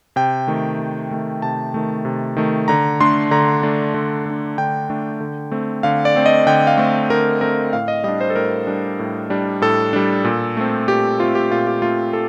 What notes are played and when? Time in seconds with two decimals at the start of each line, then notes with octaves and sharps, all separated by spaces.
0.16 C3 G5
0.48 D#3 A3
0.79 C3
1.11 D#3 A3
1.42 C3 A5
1.74 D#3 A3
2.05 C3
2.37 D#3 A3
2.68 D3 A#5
3.01 A3 D4 C6
3.31 D3 A#5
3.63 A3 D4
3.94 D3
4.26 A3 D4
4.58 D3 G5
4.90 A3 D4
5.20 D3
5.51 A3 C4
5.83 D3 F5
6.05 D5
6.16 A3 C4
6.26 D#5
6.46 D3 G5
6.67 F5
6.78 A3 C4
7.10 D3 A#4
7.41 A3 C4 A#4
7.73 A2 F5
7.88 D#5
8.04 G3 D4 D#5
8.21 C5
8.30 A4
8.35 A2 A#4
8.67 G3 D4
8.99 A2
9.30 G3 D4
9.62 A2 A4
9.93 G3 D4
10.25 A#2
10.57 A3 C4
10.88 A#2 G4
11.19 A3 C4 F4
11.35 G4
11.51 A#2 F4
11.67 G4
11.82 A3 C4 F4
12.13 A4